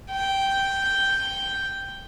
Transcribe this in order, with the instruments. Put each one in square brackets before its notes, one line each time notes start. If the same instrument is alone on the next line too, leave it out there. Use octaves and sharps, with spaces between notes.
[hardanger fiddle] G5